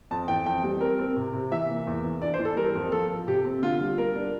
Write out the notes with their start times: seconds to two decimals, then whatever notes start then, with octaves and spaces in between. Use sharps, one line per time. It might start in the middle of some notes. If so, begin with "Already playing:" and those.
0.11 F2 A5
0.28 E3 G5
0.46 F2 G5
0.63 G3
0.81 C4 A#4
0.99 C4
1.16 C3
1.33 C3
1.51 E3 E5
1.69 A#3
1.87 E2
2.04 E3
2.22 D4 D5
2.34 C5
2.39 E3
2.45 A4
2.56 G3 A#4
2.75 F2
2.92 F3 A4
3.10 F3
3.27 C3 G4
3.45 C4
3.62 D3 F4
3.81 G3
3.98 G3 A#4
4.15 D4